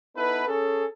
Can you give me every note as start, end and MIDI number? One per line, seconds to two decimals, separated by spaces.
0.16 0.46 59
0.16 0.46 63
0.16 0.46 64
0.16 0.46 69
0.16 0.46 71
0.48 0.85 61
0.48 0.85 68
0.48 0.85 69